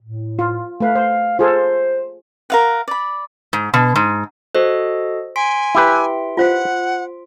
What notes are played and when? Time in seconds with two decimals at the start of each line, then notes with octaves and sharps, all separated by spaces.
0.02 A2
0.39 F4
0.80 A3 B4 F5
0.95 C5
1.39 F4 G#4 A4 C5
2.50 A#4 F5 F#5
2.88 D5 B5
3.53 G#2
3.74 B2
3.96 G#2
4.55 F#4 A4 C5 D#5
5.36 G#5 C6 B6 D7
5.75 E4 G4 B4
6.37 F4 C5 F5 F#5